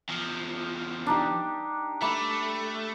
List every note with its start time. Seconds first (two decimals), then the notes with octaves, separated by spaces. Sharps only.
0.09 E2 F3
1.06 D4 D#4 G4
2.01 A3 E5 B5 D6